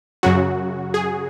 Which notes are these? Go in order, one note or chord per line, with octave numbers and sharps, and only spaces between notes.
F#2 C#3 F#3 F#4
G#4